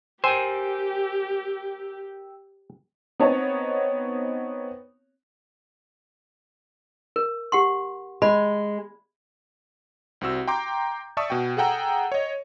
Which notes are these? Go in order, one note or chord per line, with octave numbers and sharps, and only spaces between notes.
G4 A#4 C5 G5 G#5 E6
B3 C4 D#4 C#5 A5
A#4
G4 F#5 C6
G#3 B5
C2 C4 F#4 E6
G5 A#5 C6 D6 G6
D5 E5 A5 C#6 D#6 E6
B2 F#4 G5
G#4 A4 F#5 G5 A#5 E6
C#5 D#5